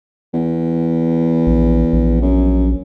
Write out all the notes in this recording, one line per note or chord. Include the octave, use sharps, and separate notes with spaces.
E2
A#1
A#1
F#2